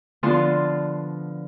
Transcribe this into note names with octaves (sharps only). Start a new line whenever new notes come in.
D3 F3 B3 F4 A5 C6